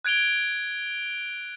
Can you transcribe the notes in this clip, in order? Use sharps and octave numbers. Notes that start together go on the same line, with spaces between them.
F#6 G#6 D7 F7 G7